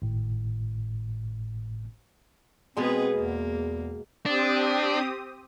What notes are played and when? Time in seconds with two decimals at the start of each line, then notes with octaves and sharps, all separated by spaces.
0.02 G#1 A2
2.77 B2 G#3 B3 C4 G#4 B4
3.15 E2 A#3
4.26 C4 D4 G4 D#6